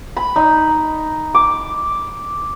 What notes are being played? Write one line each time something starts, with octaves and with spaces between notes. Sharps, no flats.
B5
D#4
D6